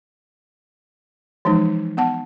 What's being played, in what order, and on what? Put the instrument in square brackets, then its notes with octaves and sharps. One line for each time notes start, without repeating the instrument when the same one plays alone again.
[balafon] E3 F3 G#3 D#4
B3 F#5 A5